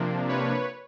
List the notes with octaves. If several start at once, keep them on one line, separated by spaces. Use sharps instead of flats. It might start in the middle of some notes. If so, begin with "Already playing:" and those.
Already playing: C3 F3 A#3 D4
B4 C#5